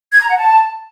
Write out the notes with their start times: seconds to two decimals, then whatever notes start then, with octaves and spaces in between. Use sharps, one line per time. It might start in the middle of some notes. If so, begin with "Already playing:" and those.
0.12 G#6
0.21 A#5
0.29 F#5
0.37 A5